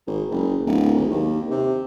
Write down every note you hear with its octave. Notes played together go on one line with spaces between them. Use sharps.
G#1
F#1
D1
G#1
D#2
C3